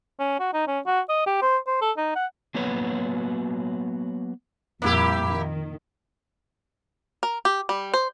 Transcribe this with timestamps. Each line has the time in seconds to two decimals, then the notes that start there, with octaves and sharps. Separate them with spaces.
0.20 C#4
0.40 F#4
0.54 D#4
0.67 C#4
0.86 F#4
1.09 D#5
1.27 G4
1.42 C5
1.67 C5
1.82 A4
1.97 D#4
2.16 F#5
2.55 F#3 A#3 B3 F#4 B4 C#5
4.82 F2 A#2 G3 A#3 E4 G4
5.29 D#3
7.23 A#4
7.45 G4
7.69 G3
7.94 C5